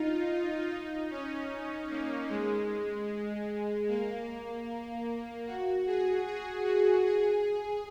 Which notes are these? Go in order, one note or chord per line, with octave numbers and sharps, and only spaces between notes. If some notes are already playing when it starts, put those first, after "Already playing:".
Already playing: D#4 F4
D#4
C#4
A#3
G#3
A#3
F#4
G#4
G#4
F#4
G#4